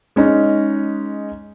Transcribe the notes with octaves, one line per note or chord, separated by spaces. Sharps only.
G#3 C#4 D#4